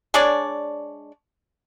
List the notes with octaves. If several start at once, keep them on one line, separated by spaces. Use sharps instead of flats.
G#3 D4 C#5 D5